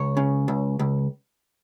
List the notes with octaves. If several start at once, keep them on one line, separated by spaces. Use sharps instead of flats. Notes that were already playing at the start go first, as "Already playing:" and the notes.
Already playing: C#2 C#5
C#3
C#2
C#2